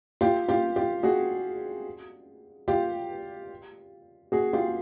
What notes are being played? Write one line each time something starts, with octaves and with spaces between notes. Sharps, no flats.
F4 G4
F4 G4
F4 G4
F#4 G#4
F4 G4
F#4 G#4
F4 G4